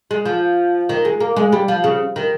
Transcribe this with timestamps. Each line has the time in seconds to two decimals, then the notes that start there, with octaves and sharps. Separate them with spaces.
0.11 G#3
0.26 F3
0.89 D#3
1.05 G#3
1.20 A#3
1.36 G#3
1.53 G3
1.68 F3
1.84 C#3
2.16 D#3